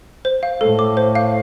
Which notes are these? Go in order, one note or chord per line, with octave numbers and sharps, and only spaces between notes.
C5
F5
A2 A4
D6
C5
F5